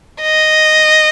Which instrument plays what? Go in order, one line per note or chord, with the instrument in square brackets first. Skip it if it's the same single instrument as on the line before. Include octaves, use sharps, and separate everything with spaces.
[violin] D#5